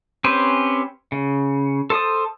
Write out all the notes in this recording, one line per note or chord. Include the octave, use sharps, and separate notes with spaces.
C4 C#4 G4 B4 C5
C#3
A4 C5 A5 D#6